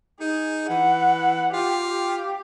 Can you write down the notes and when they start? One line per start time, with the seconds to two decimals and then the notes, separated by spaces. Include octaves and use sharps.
0.20 D#4 G#4
0.70 E3 F#5
1.53 F4 G4
1.88 G4